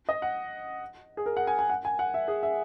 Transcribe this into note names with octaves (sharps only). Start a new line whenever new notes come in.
D#5
F#5
G#4
A#4
F#5
G#5
G#5
F#5
G#5
F#5
E5
G#4
E5